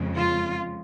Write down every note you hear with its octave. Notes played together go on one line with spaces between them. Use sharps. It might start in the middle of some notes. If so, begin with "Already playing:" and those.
Already playing: F2 C#3 G#3
F4